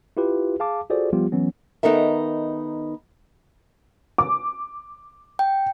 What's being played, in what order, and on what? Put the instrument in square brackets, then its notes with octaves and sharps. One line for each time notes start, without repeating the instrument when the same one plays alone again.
[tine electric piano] E4 F4 G4 B4
G#4 F5 A5 D6
F4 F#4 G#4 A4 C5 D5
F3 G3 B3 F4 G4
E3 F#3 B3 C#4
[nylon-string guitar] D#3 B3 D#4 A4 A#4 E5
[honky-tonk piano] D6
[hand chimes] G5